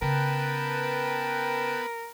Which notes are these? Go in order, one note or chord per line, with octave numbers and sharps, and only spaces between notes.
C#3 B3 A#4 B4 G5 A5